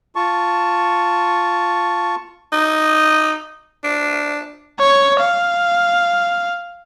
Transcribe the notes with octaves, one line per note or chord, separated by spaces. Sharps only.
F4 A5 C#6
D#4
D4
C#5
F5